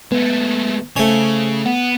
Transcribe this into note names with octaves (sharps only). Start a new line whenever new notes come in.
G#3 A3 B3 B4
C#3 A3 C5 C#5 G#5
B3 F#5